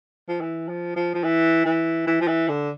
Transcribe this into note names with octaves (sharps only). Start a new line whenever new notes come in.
F3
E3
F3
F3
F3
E3
E3
E3
F3
E3
D3